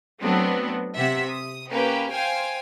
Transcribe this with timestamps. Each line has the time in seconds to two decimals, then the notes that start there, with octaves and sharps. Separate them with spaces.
0.21 F#3 A3 B3 C4 D4
0.96 C3 E5 F#5
1.27 D#6
1.70 A#3 C#4 G4 B4
2.13 C5 F5 G5 G#5